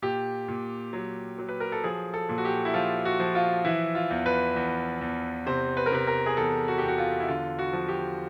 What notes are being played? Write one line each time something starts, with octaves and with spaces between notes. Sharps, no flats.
A#2 G4
A#2
F#3
F#3
B4
A#4
A4
F3 G#4
A4
A#2
F#4
G4
E4
F3 F4
F#4
F3
F4
E3 E4
F4
E2
B4
E2
E2
C3 C5
B4
A#4
C3 B4
A#4
G#4
E2 A4
F#4
E2 G4
F#4
F4
E4
D3 F4
F#4
F3
G4